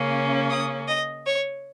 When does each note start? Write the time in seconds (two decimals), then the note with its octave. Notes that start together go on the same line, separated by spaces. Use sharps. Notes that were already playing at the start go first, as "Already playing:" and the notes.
Already playing: C#3 A#3 C#4
0.50 D#6
0.87 D#5
1.25 C#5